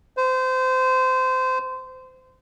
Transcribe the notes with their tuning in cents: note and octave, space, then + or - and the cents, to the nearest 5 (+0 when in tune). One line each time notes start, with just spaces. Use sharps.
C5 -25